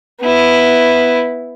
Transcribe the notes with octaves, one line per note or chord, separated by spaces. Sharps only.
B3 E4